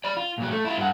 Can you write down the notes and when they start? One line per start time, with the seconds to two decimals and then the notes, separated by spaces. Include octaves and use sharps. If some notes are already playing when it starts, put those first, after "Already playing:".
0.04 D5 B5
0.17 F4
0.38 A#2 F#3
0.51 A3
0.65 E4 F4
0.78 G2 F#5